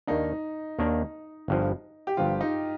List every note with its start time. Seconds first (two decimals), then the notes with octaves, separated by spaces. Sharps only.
0.07 D#2 D#3 A#3 D4 D#4
0.79 D#2 D#3 A#3 D4
1.48 G1 G2 F3
2.07 G4
2.17 G1 G2 F3 F4
2.41 D#4